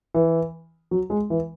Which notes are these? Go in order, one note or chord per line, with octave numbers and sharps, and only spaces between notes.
E3
F#3
G#3
E3